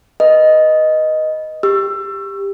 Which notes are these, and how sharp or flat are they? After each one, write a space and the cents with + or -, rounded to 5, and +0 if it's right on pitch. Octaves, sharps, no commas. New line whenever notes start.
B4 -20 D#5 +0
G4 +15 E6 +25